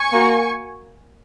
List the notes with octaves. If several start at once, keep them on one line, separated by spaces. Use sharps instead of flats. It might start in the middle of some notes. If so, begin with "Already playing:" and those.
Already playing: G#5 C#6
A#3 F#4